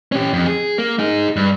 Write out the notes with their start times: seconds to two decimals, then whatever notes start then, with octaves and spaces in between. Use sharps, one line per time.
0.12 C#4 G4
0.33 F2
0.47 G#4
0.78 A#3
0.99 D#4 G#4
1.36 G2